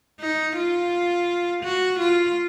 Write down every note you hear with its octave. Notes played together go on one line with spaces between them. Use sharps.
D#4
F4
F#4
F4